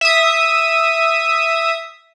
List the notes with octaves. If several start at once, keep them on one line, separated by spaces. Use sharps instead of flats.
E5 D#6